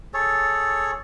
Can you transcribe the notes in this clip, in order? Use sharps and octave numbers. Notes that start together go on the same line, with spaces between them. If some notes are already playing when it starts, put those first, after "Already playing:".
G#4 A4 C#5